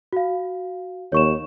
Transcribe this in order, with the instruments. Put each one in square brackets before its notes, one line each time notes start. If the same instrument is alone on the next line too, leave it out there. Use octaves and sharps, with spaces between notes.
[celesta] F#4 F5
[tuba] D#2 [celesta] C#5 C#6 E7